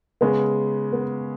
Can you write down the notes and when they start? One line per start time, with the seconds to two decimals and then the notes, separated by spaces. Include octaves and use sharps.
0.21 C#3 G#3 B3 C#4
0.93 B3